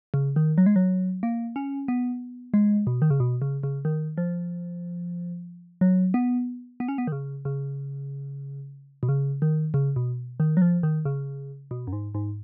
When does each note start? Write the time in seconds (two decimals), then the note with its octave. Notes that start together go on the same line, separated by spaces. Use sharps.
0.14 C#3
0.36 D#3
0.58 F#3
0.66 G#3
0.76 F#3
1.23 A#3
1.56 C#4
1.88 B3
2.54 G#3
2.87 B2
3.02 D#3
3.10 C#3
3.20 B2
3.42 C#3
3.63 C#3
3.85 D#3
4.18 F3
5.81 F#3
6.14 B3
6.80 B3
6.88 C#4
6.98 B3
7.07 D#3
7.12 C#3
7.45 C#3
9.03 B2
9.09 C#3
9.42 D#3
9.74 C#3
9.96 B2
10.40 D#3
10.57 F#3
10.62 F3
10.83 D#3
11.05 C#3
11.71 B2
11.87 F#2
11.93 G#2
12.15 G#2